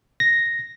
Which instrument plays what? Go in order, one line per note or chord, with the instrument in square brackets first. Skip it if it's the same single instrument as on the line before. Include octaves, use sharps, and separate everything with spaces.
[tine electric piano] A#6